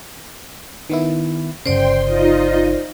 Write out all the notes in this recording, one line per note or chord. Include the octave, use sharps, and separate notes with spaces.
D#3 B3 E4
G1 C#3 C5 D5 G5 C6
D#4 F4 D#5